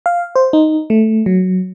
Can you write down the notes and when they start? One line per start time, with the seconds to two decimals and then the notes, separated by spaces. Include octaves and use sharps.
0.06 F5
0.36 C5
0.53 D#4
0.90 A3
1.26 F#3